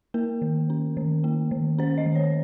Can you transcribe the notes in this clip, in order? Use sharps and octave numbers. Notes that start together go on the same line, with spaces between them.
A#3 A#4
D#3
C#4
D#3
A#3
D#3
C#4 C5
D#5
D#3
C#5